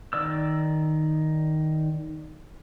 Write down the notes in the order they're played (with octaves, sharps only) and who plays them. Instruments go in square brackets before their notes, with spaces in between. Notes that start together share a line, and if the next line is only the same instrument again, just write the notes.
[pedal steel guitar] D#3 D5 E6